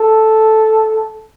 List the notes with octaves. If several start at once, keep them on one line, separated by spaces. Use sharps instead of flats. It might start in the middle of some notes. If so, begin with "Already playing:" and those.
Already playing: A4